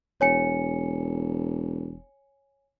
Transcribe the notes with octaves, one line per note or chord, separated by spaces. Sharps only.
E1 C#5 G#5 C#7